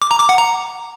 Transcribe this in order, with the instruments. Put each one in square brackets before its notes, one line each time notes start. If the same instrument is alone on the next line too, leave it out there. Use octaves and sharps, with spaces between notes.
[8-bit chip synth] D6
A#5
D6
F#5
A#5